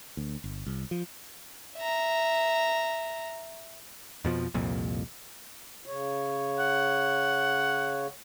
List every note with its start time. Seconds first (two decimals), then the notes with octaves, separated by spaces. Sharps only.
0.17 D2
0.44 G1
0.66 C2
0.91 F3
1.77 E5 A#5
4.25 F2 B2 F3
4.54 C2 F2 A#2
5.86 C#3 C#5
6.59 F#5